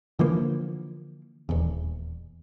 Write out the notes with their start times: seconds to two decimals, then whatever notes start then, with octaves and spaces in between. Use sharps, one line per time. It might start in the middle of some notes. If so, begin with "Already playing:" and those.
0.19 D3 E3 F3 A#3
1.49 D#1 E2